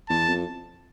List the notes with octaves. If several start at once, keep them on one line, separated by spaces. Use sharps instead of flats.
E2 A5
F2